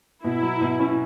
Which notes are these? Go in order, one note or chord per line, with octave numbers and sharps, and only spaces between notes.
B2 E4
F#3
B2
C#4